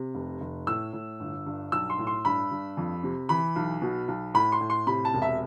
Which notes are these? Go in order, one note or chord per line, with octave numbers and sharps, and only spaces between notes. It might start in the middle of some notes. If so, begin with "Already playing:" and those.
Already playing: C3
F1
F1
A2 E6
A2
G1
G2
B1 E6
C6
A2
C6
G2 B5
G2
F2
C3
E3 B5
B1
B2
B1
A2 B5
C6
A2
C6
C3 B5
A5
E1
E5